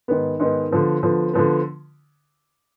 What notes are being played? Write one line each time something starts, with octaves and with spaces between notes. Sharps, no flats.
G#2 D#3 B3
G#2 D#3 B3
D3 F3 B3
D3 F3 B3
D3 F3 B3